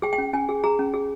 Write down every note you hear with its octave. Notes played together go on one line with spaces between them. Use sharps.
G#4 G5
G5
C#4
C#4 G#5
G#4
G#4 A#5
C#4
G#4